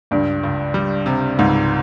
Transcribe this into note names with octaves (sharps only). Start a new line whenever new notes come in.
C#2 G2
C#2
G3
C3
C#2 G#2